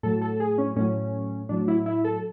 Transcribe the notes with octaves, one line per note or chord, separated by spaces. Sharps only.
A2 F#3 A4
A4
G#4
C#4
A2 F#3 C#4
A2 F#3 D4
E4
E4
A4